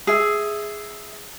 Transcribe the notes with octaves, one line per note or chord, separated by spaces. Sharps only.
G#4 E5